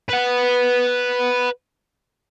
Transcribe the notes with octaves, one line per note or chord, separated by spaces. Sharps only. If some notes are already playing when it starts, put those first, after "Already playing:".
B4 F#5